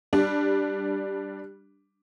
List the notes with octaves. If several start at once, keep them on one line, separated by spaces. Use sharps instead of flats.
G3 D4